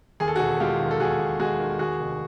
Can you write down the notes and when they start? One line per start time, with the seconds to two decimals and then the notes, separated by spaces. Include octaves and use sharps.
0.20 D#2 G#4
0.28 A4
0.36 E1 F#4 G#4
0.60 G#3 F4 G4
0.80 D#3
0.91 A4
1.00 D#2 F#4 G#4
1.20 E1
1.40 G#3 F#4 G#4
1.60 D#3
1.79 D#2 F#4 G#4
2.00 F1